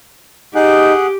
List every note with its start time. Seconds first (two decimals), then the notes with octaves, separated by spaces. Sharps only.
0.55 D#4 G4 G#4 F#5